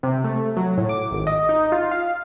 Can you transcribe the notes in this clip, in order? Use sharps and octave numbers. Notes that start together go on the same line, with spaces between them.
C3
A3
F#3
A2
D6
G#1
D#5
D#4
F4
F5